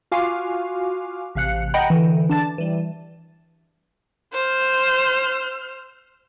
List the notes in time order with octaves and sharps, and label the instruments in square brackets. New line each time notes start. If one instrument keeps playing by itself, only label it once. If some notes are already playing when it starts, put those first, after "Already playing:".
[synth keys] F4 F#4 F5 G#5 D6
A1 C3 F5 F#6 C#7
D#5 F#5 G5 A#5 B5 G6
D3 E3
D4 A5 A6
E3 G3
[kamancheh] C5 F6